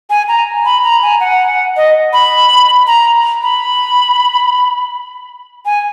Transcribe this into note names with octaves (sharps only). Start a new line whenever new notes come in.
G#5
A#5
B5
A#5
G#5
F#5
D#5
B5
A#5
B5
G#5